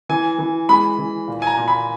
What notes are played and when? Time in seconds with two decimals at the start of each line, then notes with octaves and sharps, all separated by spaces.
0.09 E3 G#5
0.39 E3
0.69 G#3 B5
0.99 E3
1.28 A#2
1.42 G#5
1.47 A#5
1.57 A#2
1.68 B5